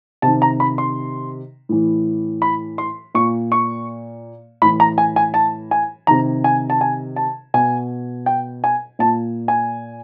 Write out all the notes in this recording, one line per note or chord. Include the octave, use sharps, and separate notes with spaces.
C3 D#3 A5
A#5
B5
C6
A2 E3
B5
C6
A#2 C#6
C#6
A2 E3 B5
A#5
G#5
G#5
A5
G#5
C3 D#3 A#5
G#5
A5
G#5
A5
B2 G#5
G5
G#5
A#2 A5
G#5